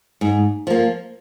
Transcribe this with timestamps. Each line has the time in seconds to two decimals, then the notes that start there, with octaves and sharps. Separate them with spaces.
0.21 G#2
0.67 F3 A#3